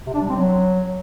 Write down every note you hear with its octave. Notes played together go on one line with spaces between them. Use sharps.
C3
D4
G3
C4
F#3